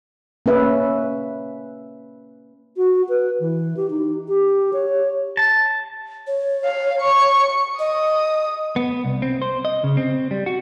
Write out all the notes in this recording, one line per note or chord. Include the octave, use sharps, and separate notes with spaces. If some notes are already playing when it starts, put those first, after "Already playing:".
A#3 C#4 B4 E5
F#4
B4
E3
G4
D#4
G4
C#5
A5
C#5
F5
C#6
D#5 D#6
B3
C2
C4
C5
D#5
C#3
C4
G3
F#4